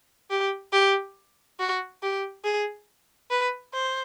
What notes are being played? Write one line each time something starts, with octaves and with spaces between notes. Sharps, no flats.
G4
G4
F#4
G4
G#4
B4
C5